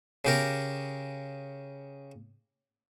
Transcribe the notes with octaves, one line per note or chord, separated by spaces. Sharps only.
C#3 G4 A#4